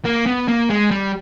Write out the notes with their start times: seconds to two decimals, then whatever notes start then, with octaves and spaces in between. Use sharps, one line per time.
0.05 A#3
0.26 B3
0.48 A#3
0.70 G#3
0.91 G3